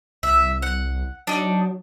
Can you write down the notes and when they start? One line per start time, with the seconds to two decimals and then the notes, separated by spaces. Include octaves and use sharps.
0.23 C2 E5
0.62 F#5
1.27 F#3 D4 D#4